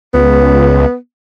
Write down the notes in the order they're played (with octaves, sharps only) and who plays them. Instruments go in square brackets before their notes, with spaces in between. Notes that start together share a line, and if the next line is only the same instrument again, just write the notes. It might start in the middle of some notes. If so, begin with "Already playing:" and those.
[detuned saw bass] C#2 [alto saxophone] B3